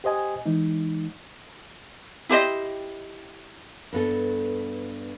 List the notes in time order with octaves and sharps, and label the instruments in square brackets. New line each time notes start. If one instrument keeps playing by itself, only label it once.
[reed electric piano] G4 C5 D#5 G#5
E3 G#3 D#4
[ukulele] E4 G4 C5 D#5
[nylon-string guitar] G2 B3 A4